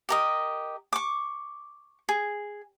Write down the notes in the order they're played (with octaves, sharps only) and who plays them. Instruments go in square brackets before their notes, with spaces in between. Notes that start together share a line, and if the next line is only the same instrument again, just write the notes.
[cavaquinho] G4 A#4 D#5
C#6 D6
G#4